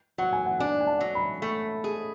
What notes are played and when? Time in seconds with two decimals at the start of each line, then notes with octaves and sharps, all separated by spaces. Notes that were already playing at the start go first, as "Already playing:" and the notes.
0.18 F#3 F#5
0.33 G#5
0.46 F#5
0.59 D4 G#5
0.80 G#5
0.87 A5
1.01 F#3
1.15 B5
1.42 A3
1.84 G#4